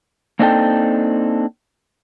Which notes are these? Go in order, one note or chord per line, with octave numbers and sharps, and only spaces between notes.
A#3 C4 D4 D#4 A4 G5